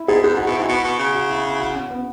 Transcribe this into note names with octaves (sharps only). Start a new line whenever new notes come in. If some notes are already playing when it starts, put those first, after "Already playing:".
Already playing: E4
G#2 G#4
F#2 G#4
G#2 F#4
B2 E4
G#2
F#4
B2
B2
C#3
F#4
E4
E4
F#4
C#4
B3